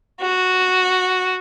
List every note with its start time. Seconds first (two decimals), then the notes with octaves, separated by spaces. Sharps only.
0.21 F#4